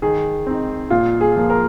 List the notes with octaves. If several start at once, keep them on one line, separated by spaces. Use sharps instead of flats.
D#3 G#4
C4 D#4
A#2 F4
G#4
F3 A#3
A#4